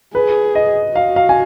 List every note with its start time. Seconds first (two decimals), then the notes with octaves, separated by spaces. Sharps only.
0.15 G#4 B4
0.55 D#5
0.95 F#4 F5
1.16 F5
1.29 G#5